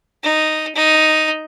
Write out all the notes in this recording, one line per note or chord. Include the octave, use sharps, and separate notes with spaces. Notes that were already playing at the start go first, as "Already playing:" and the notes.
D#4
D#4